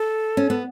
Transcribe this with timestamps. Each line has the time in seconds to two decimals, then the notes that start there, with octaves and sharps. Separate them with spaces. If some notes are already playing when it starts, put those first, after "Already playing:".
Already playing: A4
0.37 C#4
0.50 B3